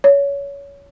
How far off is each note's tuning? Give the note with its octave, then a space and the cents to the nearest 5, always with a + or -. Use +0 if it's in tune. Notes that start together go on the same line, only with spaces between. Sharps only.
C#5 +25